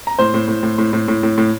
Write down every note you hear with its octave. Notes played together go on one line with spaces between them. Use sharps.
A#5
A2 C5 C6
A2
A2
A2
A2
A2
A2
A2
A2